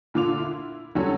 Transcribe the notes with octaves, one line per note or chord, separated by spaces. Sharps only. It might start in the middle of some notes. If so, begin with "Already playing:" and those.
A#2 D3 F4 D6 F7
E4
D3 F#3 G3 C#4 A4 C#5